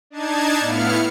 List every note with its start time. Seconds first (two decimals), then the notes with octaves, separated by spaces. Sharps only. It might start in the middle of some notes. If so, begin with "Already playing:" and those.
0.10 D4 D#4 A5 G#6
0.60 A2 B3 E4 F5 F6 C#7